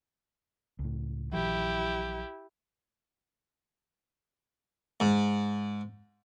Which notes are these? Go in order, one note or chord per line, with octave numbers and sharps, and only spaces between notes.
C#2 A2
A#1 E3 F#3 E4 G4
G#2